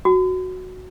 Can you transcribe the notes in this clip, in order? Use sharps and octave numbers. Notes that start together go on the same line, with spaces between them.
F#4